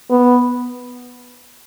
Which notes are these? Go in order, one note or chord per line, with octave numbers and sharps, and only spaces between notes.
B3